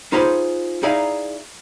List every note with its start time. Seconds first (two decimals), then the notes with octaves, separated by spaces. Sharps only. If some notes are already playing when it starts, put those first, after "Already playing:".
0.12 D#4 F4 G#4 C5 B5 C6
0.83 D#4 E4 G#4 D5 F5 A#5